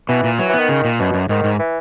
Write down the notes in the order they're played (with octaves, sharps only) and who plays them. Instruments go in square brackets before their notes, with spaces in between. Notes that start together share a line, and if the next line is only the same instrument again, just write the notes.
[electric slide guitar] B2 [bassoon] E3
[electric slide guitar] A#2
[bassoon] E3 [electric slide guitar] F#3
[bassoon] E3
[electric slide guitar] B3
[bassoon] D#3
[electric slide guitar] C#3
A#2
[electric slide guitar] F#2 [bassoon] B2
[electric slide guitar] F#2
[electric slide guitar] G#2 [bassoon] D#3
[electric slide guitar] G#2
[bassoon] E3